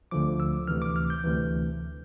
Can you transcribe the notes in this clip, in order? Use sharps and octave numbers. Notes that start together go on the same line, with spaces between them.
D2 D3 F3 D6
E6
D2 C3 E3 F6
D6
F6
G6
D2 C3 E3